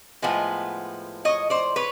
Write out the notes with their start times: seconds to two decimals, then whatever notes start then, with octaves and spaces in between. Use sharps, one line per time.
0.22 A2 F3 G#3 B3
1.25 C#5 D#5
1.50 C5 D5
1.76 B4 C#5